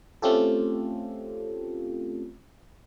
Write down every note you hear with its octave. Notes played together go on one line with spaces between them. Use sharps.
A3 C4 C#4 F4 G4 A4